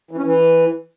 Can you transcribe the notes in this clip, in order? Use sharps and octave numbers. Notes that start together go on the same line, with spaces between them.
E3
C#4
E3